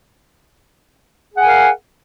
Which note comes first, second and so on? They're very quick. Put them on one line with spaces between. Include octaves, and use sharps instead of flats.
G#4 F#5 G#5 A#4 F5